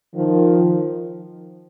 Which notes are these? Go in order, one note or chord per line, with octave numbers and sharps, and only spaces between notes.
D#3 F3